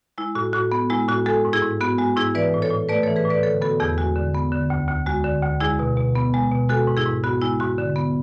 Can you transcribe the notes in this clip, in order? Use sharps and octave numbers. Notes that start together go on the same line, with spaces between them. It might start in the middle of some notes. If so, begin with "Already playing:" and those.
G#3 E4
A2 F#4
A2 F#4
B3
G#3 E4
A2 F#4
G#3 F#4 A4
G#2
E4 G#4
G#2
B3 F#4
G#3 F#4
G#2 E4 G#4
E3 B4 D5
A2
A4 C#5
A2
A3 B4 D5
E3 A4 C#5
G#4 B4
A2
B4 D5
D3 A4 C#5
B3 F#4 A4
E2 E4 G#4
G#3 F#4
D3
B3
D3
D2
D2
G#3 F#4
D3
D2
G#3 E4 G#4
B2
B2
B3
G#3
B2
G#3 F#4 A4
G#2
E4 G#4
G#2
B3 F#4
G#3 E4
G#2 F#4
D3
B3